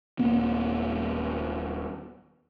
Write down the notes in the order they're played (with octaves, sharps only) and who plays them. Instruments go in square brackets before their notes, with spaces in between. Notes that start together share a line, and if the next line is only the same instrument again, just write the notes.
[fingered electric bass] D#1 A#3 B3